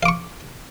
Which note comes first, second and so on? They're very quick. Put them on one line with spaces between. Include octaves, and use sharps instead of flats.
F5 D6 C#6